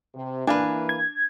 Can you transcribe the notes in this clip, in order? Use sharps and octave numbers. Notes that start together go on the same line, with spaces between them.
C3
E3 A#3 D4 B4 F5 G#5
G#6